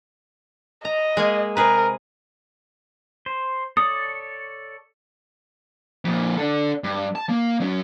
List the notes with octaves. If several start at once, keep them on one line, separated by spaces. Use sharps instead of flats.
D#5 A#5
G#3 A#3 G#4
C3 G#4 A#4 B4
C5
A4 C#5 D5 D#6
F2 A#2
D4 A4
G2
A5
A#3
F#3 C#4